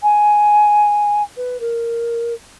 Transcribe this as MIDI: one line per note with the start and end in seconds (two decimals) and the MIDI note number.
0.02 1.23 80
1.36 1.59 71
1.60 2.33 70